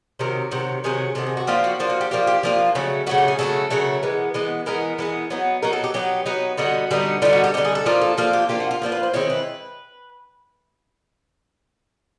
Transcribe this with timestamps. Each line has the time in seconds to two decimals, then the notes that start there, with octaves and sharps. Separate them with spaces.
0.19 C3 D#3 F#3 A#4
0.51 C3 D#3 F#3
0.84 C3 D#3 F#3 G#4
1.15 C3 D#3 F#3 A4
1.27 G#4
1.37 F#4
1.47 F3 A#3 D4 F4 G4
1.64 F#4
1.80 F3 A#3 D4 F4
1.90 F#4
2.01 G4
2.11 F3 A#3 D4 F4 G4
2.27 G4
2.43 F3 A#3 D4 F4
2.75 C#3 F#3 A3
3.06 C#3 F#3 A3 F#4
3.18 G4
3.28 G#4
3.39 C#3 F#3 A3 A4
3.70 C#3 F#3 A3 A#4
4.03 E3 G#3 B3
4.34 E3 G#3 B3
4.66 E3 G#3 B3 A#4
4.99 E3 G#3 B3
5.30 F#3 B3 D#4
5.62 F#3 B3 D#4 A#4
5.73 A4
5.84 G4
5.94 F#3 B3 D#4 G4
6.26 F#3 B3 D#4
6.57 D3 G3 B3 D#4 F#4
6.91 D3 G3 B3 D#4
7.22 D3 G3 B3 D#4 F4
7.33 F#4
7.44 G4
7.54 D3 G3 B3 D#4 G4
7.65 G#4
7.75 A4
7.85 F3 A#3 D4 F4 A#4
8.01 A4
8.18 F3 A#3 D4 F4 A4
8.33 G4
8.49 F3 A#3 D4 F4 G4
8.60 F#4
8.71 F4
8.82 F3 A#3 D4 F4
8.92 B4
9.03 C5
9.13 D#3 G#3 C4 E4 C#5
9.30 B4